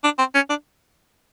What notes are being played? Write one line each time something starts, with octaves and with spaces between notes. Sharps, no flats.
D4
C4
C#4
D4